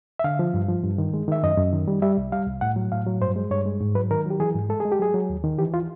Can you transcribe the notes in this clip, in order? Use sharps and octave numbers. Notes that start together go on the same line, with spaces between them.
E5
D3 F5
F3
G2
F3
G2
D#3
G#3
D#3 E5
F#2 D#5
F#2
D#3
G3
G3 E5
C2
G3 F5
C2
A2 F#5
F#3
A2 F5
F#3
G2 C5
G#3
G2 C#5
G#3
G#2
F#3 B4
D#3 A#4
F#3 G4
E3 G#4
G#2
G#3 A4
G#3 G#4
G4
F#3 G#4
F#3
D#2
D#3
E3 G4
F4